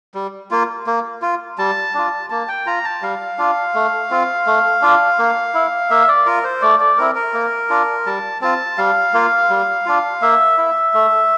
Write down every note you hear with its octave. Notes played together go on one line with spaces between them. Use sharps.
G3
A#3 F4
A#3
F4
G3 A5
D4 F4
A#3 A5
G5
F4 A#5
A5
G3 F5
D4 F4
A3
C4 F4
A3
D4 F4
A#3
E4
A#3 E5
D5
F4 A#4
C5
A3 D5
D5
C4 E4 A#4
A#4
A#3
D4 F4
G3 A5
C4 F4 A5
G3 F5
A#3 F4
G3
D4 F4
A#3 E5
E4
A3